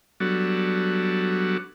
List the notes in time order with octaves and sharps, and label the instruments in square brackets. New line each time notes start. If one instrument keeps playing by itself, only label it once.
[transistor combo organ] F#3 G3 B3 D4 F#4 A4